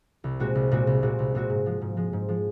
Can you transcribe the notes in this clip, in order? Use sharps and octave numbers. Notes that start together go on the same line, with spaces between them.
C2
A#2 G#3 C4 F#4
C2
A#2 G#3 C4 F#4
C2
A#2 G#3 C4 F#4
C2
A#2 G#3 C4 F#4
G#2
F3 G#3
G#2
F3 G#3
G#2
F3 G#3